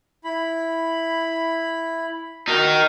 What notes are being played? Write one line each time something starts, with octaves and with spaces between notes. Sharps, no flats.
E4 B5
D#4 F#4 A#4 D#5